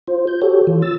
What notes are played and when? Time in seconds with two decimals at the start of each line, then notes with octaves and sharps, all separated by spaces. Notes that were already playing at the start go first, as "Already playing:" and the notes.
0.08 F4 C5
0.27 G6
0.42 F#4 G4 A4 C#5
0.67 E3 F4
0.82 E6 A6